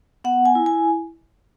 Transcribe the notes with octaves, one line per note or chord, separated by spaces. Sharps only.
B3 F#5
G#5
E4
G#5